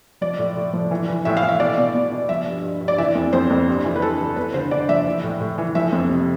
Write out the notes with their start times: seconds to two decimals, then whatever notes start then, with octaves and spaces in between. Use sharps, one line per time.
0.21 F3 D5
0.39 A2
0.56 A2
0.73 F3
0.91 E3
1.08 E3
1.25 A2 E5
1.37 F5
1.43 E3
1.49 E5
1.60 B2 D5
1.78 B2
1.95 B2
2.12 B2
2.29 F3 E5
2.46 G2
2.64 G2
2.81 G2
2.88 D5
2.98 E3 E5
3.15 F2
3.33 F2 C5
3.50 F2
3.68 G2
3.85 E3
3.96 B4
4.02 G2 A4
4.19 E3
4.36 E2 B4
4.54 D3 C5
4.71 D3 D5
4.89 F3 E5
5.06 E3
5.23 A2
5.41 A2
5.58 E3
5.75 F3 E5
5.92 F2
6.09 C3